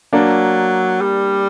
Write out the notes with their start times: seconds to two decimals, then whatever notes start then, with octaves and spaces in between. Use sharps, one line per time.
0.13 F#3 A#3 D4
1.01 G3